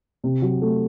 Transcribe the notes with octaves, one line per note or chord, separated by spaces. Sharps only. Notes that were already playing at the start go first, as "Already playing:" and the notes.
C3
F#3
A3